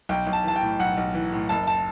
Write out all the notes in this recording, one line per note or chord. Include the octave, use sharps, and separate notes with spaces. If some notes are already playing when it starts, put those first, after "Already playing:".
B1 G5
B1
A5
E3 A5
G5
A2
B1 F#5
B1
E3
A2
F#1 A5
A5